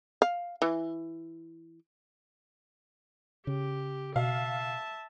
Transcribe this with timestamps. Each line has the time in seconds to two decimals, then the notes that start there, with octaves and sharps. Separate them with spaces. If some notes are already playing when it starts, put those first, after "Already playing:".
0.22 F5
0.62 E3
3.47 C#3 G4
4.16 B2 E5 F5 A5